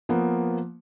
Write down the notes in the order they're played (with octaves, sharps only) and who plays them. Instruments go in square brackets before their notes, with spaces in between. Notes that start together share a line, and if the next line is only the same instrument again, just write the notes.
[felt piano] F3 A#3 B3